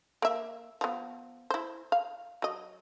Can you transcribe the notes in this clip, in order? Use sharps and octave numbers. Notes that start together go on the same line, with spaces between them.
A#3 E5
F3 B3
E4 C5
F5
F#3 D#5